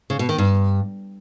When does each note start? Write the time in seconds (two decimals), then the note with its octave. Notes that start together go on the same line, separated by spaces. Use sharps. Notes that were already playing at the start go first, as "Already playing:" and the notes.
0.10 C#3
0.19 B2
0.29 D#3
0.38 G2